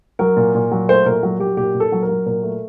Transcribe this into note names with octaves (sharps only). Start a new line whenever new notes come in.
F#3 A#4
A#2
A#2
F#3
A3 C5
A#2 A#4
F#3
F#3 G4
A#2 G4
A#2
A4
F#3
A#4
F#3
A#2 A#4
A3